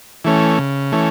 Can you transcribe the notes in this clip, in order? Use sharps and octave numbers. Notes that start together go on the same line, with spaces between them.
E3 A3 C#4
C#3
E3 A3 C#4